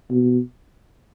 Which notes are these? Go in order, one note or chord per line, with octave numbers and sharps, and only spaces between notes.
B2